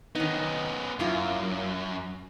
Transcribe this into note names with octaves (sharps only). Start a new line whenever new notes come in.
D#3 B3 C#4 D#4
F#2 A#3 E4 F4